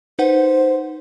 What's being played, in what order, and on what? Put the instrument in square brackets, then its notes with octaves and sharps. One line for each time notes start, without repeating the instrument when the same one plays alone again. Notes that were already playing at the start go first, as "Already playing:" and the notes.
[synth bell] D#4 B4 F#5 [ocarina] C5